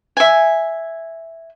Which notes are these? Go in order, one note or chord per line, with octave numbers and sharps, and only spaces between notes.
E5 G#5